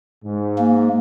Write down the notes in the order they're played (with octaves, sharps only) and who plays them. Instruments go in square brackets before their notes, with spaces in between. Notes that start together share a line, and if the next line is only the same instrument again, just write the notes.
[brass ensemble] G#2
[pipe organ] A#3